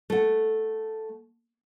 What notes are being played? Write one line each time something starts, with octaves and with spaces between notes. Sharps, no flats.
A3 F#5